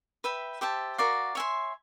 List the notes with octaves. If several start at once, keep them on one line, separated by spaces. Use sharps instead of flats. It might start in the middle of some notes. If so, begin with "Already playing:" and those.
B4 E5 G5 B5
G4 C5 E5 A5
F#4 A#4 D5 F5
C#5 E5 G#5 C6